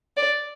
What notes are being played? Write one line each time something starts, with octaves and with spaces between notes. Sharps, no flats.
D5